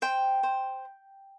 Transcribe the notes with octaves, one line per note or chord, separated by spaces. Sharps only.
C5 G5
C5